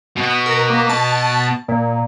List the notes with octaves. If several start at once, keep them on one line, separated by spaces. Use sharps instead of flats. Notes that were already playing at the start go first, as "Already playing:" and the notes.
B2 B3
A#4
A#3
A5
A#2